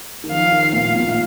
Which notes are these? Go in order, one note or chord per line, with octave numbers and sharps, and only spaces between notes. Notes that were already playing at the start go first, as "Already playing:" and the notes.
D#3
F3 F5
D#3
A#2 F5
A2
A#2